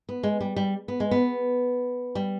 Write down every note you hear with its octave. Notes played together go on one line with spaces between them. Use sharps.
B3
G#3
G3
G3
B3
G#3
B3
G3